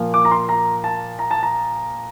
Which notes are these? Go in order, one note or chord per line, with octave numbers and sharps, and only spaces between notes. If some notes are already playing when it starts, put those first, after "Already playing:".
Already playing: A#2 F3 A#3
D6
A#5
C6
A#5
A5
A#5
A5
A#5